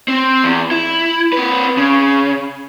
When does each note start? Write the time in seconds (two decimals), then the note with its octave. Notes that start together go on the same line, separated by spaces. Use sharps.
0.08 C4
0.44 E2
0.71 E4
1.33 C4 B4
1.77 C#3